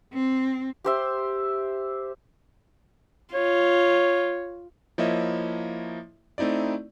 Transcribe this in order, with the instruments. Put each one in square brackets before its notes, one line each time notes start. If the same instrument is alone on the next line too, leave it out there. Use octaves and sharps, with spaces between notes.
[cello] C4
[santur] G4 C5 E5
[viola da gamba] F4 [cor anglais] C#5
[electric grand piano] F3 A#3 E4 C#5 D#5 E5
A3 C4 D#4 E4 D5